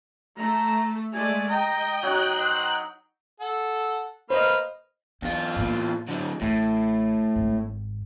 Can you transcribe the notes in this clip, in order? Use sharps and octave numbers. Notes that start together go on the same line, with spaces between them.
A3 A#5
G#3 A3 D5 G#5
D#5 G5 A#5
F#3 D#4 C#5 F#6
C5
A4 F#5
A#3 B4 C5 D#5 F6
E2 E4 F4
A2 A#3
D3 F#3
A1 A2
G#1 G#2